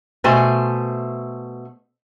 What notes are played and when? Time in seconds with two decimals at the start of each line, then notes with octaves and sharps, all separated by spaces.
0.24 B2 A3 C5 G#5